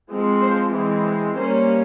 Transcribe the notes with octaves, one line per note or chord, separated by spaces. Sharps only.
F3 G#3 C4
C5
E3 G#3 C4
G3 A#3 C#4 C5